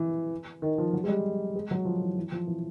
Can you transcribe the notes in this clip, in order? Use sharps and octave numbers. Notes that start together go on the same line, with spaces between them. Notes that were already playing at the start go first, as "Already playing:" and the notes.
Already playing: E3
D#3
F3
F#3
G#3
G3
G#3
F#3
F3
E3
E3
F3
E3